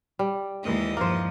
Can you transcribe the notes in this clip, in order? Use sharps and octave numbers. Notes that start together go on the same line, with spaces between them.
G3
D#2 E3 G#3 A#3 D#5
G2 F3 A#3 C5